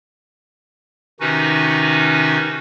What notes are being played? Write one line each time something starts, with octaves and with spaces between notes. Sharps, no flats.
C3 D#3 C#4 D#4 F#4 B4